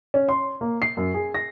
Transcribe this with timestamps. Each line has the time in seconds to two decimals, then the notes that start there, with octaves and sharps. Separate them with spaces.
0.14 C#4
0.29 C6
0.61 A#3
0.82 C7
0.97 F#2
1.14 G#4
1.35 A#6